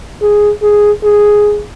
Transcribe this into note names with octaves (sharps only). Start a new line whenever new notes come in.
G#4
G#4
G#4